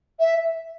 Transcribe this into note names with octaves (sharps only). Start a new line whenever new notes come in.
E5